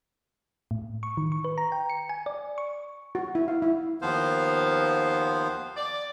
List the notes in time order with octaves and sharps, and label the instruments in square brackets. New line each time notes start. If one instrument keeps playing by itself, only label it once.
[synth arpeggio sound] A2
C#6
D#3
C#6
B4
A#5
G5
C#7
G#5
D5
C#6
[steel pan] F#4
E4
F5
E4
[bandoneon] D#2 D#3 F3 B3 C5 F5
[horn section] D5